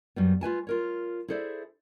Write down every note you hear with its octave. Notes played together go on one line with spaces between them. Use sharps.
F#2 G3 B3
F4 B4 G#5 A5
F4 A#4 C#5
E4 G#4 A4 C5 D5 E5